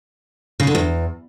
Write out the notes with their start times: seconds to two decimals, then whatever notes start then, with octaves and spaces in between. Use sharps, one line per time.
0.60 C#3
0.67 D3
0.75 E2